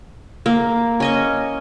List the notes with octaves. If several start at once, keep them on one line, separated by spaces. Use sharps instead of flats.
A#3
C#4 D#5 C#6